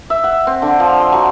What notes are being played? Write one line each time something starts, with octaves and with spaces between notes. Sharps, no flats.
E5
F#5
C4
D3
F3
C6
F#3